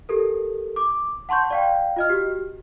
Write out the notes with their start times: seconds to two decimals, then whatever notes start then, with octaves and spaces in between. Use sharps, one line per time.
0.09 G4 A4 A#4
0.76 D6
1.29 F#5 A5 C6 C#6 G6
1.51 D5 F5 G5
1.96 F4 D#5 F6
2.09 F#4 G4